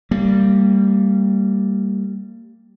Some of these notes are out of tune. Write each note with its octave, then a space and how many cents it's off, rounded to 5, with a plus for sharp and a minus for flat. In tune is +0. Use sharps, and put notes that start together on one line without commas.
G3 +0 A#3 -25